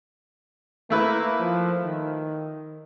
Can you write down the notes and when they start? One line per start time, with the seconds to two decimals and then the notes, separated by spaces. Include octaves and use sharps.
0.90 A3 A#3 E4 B4
1.40 F3
1.84 D#3